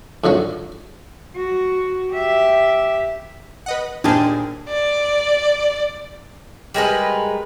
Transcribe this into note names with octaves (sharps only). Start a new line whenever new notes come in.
F2 G#2 D3 F#3
F#4
G4 E5
B4 D#5 F#5
D#2 A#2 D4 G4 G#4 C5 A5
D5
G3 G#3 A#4 B4